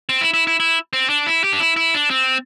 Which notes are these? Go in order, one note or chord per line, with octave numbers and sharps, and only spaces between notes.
C4
E4
E4
E4
E4
C4
D4
E4
G4
D4
E4
E4
D4
C4